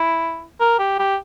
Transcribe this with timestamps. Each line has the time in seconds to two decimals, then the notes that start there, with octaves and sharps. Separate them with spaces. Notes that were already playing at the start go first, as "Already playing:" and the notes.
Already playing: E4
0.60 A#4
0.79 G4
0.99 G4